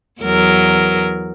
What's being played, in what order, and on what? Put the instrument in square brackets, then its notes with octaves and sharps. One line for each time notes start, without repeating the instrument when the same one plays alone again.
[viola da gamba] E2 F#3 A#4